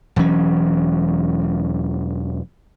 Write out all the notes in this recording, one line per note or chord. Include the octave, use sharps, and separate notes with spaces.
E1 E3 F#3 C#4